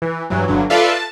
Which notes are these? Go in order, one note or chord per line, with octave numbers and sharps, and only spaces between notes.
E3
G2 E3 F#3
G1 G2 D3 F#3
F4 A4 B4 D5 E5 F5
A5